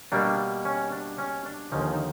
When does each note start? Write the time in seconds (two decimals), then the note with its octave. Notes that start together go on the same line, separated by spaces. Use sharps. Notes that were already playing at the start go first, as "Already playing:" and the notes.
0.12 B2 G3 A#3 D4
0.65 C#4
0.92 D4
1.18 C#4
1.45 D4
1.72 D#2 D3 F3 C#4 D#4
1.93 D#4